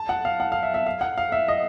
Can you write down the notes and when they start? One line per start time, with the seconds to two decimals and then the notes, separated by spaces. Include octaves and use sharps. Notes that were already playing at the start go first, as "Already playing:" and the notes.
Already playing: A5
0.09 F#5
0.25 F5
0.40 F#5
0.52 F5
0.63 E5
0.74 E5
0.87 F5
1.01 F#5
1.18 F5
1.32 E5
1.48 D#5